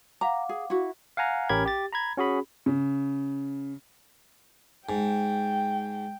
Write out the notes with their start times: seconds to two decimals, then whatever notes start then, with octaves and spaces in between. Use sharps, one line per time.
0.21 F5 F#5 A#5 D6
0.49 G#4
0.70 E4 F#4
1.17 F5 F#5 G#5 A#5
1.49 A1 C#4 G4 A#4 B5 G#6
1.66 G4 A6
1.93 A#5 B5 G#6
2.17 C#4 F#4 G#4 B5
2.66 C#3
4.89 G#2 G5